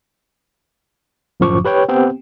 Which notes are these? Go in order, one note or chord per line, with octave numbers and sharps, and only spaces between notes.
G1 F#2 A2 F3 C#6 D6
G4 B4 C#5 G5
B3 C4 G4 G5